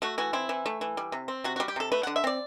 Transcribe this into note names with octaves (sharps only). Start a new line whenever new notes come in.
A3 F#4
E3 F#4
C4 E4
E3
A3
E3
G3
C3
C4
C3 F#4
G3 F#4
G4
C3 A4
A3 B4
D3 F#5
E5
C4 D5